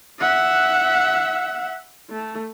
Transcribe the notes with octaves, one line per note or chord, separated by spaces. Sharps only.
E5 F#5
A3